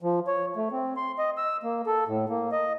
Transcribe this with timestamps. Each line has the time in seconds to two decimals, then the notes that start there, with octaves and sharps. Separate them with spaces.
0.02 F3
0.27 C#5
0.56 A3
0.72 C4
0.97 C6
1.18 D#5
1.38 E6
1.63 A#3
1.87 A4
2.08 A2
2.29 A#3
2.52 D#5